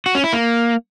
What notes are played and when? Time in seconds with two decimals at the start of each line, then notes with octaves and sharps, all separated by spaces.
0.06 F#4
0.15 C#4
0.24 E4
0.33 A#3